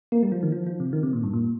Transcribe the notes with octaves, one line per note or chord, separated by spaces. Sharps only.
A#3
G3
F3
D#3
F3
F3
C3
D#3
C3
A#2
G2
A#2